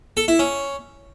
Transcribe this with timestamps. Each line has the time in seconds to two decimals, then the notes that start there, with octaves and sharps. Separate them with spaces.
0.17 A4
0.28 E4
0.39 C#4